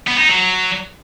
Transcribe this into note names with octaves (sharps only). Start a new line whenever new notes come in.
B3
D#4
F#3